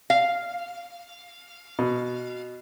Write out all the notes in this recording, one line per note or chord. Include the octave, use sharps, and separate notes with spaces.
F5
B2